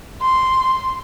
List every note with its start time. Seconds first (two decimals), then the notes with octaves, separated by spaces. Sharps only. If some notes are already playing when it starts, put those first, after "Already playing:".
0.21 C6